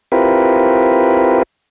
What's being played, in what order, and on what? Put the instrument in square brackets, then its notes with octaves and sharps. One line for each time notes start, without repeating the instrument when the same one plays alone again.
[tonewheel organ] C4 E4 F4 G4 A#4 B4